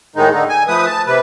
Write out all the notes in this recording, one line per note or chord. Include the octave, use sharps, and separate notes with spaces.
A2 D#3 G#3 D#4
D3 D#4
G#5
F3 A3 B4 D#6
A5
C3 B4